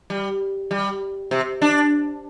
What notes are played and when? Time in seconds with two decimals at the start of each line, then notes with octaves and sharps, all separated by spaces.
0.10 G3
0.71 G3
1.31 C3
1.62 D4